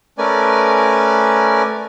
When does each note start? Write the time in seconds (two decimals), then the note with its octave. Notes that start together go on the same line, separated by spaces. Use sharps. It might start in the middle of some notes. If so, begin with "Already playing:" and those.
0.18 A3 C#4 A#4 B4 D5 G#5